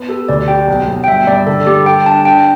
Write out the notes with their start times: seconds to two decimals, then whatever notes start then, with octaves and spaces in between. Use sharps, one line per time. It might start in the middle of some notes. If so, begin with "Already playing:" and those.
Already playing: B3
0.09 G4 A4
0.29 D2 D5
0.48 G4 G5
0.68 B1
0.88 B1
1.04 G5
1.08 G1 E5
1.27 G2 D5
1.47 D3 A4
1.67 G3 G4
1.86 A4 G5
2.06 D4 A5
2.25 D4 G5